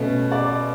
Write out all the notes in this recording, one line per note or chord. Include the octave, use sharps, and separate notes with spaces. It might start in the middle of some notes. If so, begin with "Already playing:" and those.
Already playing: B2 A3 C#4
D5